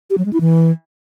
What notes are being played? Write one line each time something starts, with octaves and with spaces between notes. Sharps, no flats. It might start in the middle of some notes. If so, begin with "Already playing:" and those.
G4
F#3
G#3
E4
E3